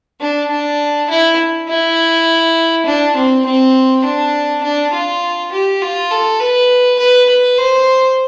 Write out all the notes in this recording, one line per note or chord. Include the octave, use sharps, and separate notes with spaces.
D4
D4
E4
E4
D4
C4
C4
D4
D4
F4
G4
F4
A4
B4
B4
B4
C5